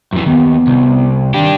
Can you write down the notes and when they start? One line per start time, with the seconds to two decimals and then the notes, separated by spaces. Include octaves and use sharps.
0.13 F#2 E3
0.26 D#2 B3
0.67 C2
1.34 D#3 D4 G4